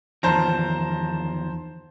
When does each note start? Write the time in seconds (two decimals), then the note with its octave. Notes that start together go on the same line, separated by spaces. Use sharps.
0.23 E2 D#3 F3 C5 A5 A#5